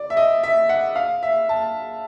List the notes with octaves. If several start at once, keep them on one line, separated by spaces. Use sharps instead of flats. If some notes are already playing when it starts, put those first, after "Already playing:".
Already playing: D5
E5
D#5
E5
F#5
F5
E5
A5